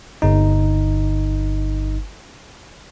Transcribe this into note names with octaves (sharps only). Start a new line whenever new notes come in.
G1 D#4